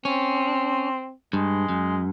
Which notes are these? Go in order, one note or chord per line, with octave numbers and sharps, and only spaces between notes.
C4 C#4
G2 G#3
F#2